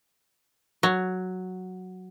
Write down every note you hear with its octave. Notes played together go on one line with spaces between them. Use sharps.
F#3